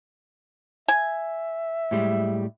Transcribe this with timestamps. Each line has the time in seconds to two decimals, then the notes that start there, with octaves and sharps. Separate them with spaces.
0.88 E5 G#5
1.91 A2 G3 G#3